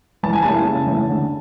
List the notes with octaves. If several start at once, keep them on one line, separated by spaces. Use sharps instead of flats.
E3 A5
G#5
G3 A#3 C#4 E4 A5
C#3
E3 A3 C#4 E4
D3